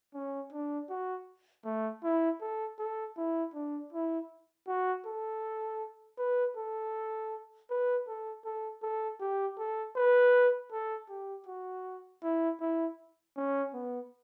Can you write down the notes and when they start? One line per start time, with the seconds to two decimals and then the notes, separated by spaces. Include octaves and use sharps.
0.15 C#4
0.53 D4
0.90 F#4
1.65 A3
2.04 E4
2.41 A4
2.79 A4
3.17 E4
3.54 D4
3.93 E4
4.68 F#4
5.06 A4
6.18 B4
6.57 A4
7.70 B4
8.07 A4
8.45 A4
8.83 A4
9.20 G4
9.58 A4
9.96 B4
10.72 A4
11.10 G4
11.47 F#4
12.23 E4
12.61 E4
13.37 C#4
13.74 B3